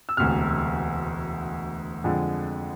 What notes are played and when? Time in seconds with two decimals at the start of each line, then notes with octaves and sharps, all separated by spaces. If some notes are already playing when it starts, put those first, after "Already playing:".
0.09 E6
0.17 E1 D2 C3 F6
2.04 F2 D3 G#3